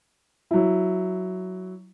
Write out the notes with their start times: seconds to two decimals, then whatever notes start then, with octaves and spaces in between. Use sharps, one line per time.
0.51 F#3 E4